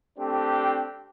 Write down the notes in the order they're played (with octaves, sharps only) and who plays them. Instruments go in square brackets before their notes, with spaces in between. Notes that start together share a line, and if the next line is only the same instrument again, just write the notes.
[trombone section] A3 C4 D4 G4